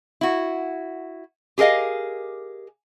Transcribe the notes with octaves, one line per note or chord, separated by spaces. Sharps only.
E4 F#4
G4 G#4 A#4 D#5 F5